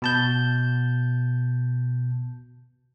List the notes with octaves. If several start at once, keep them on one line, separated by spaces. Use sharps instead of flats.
B2 A5 G6